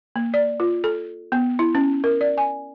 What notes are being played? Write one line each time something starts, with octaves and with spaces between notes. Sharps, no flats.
A#3
D5
F4
A4
B3
E4
C#4
A#4
D5
G#5